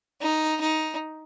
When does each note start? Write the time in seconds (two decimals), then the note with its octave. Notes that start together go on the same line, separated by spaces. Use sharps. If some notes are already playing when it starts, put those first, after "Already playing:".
0.21 D#4
0.61 D#4